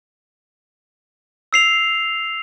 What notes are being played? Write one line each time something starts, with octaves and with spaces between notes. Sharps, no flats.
E6 C7 F7